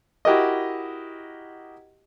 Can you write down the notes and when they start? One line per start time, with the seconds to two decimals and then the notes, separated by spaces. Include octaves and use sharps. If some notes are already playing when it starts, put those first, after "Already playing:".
0.25 E4 F#4 G4 A#4 D#5